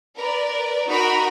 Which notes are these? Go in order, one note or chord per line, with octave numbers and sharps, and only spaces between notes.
A#4 B4 D5
D#4 F#4 A#4 A#5 B5